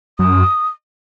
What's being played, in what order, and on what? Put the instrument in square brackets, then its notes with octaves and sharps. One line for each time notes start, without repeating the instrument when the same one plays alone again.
[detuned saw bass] F#2 [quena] D#6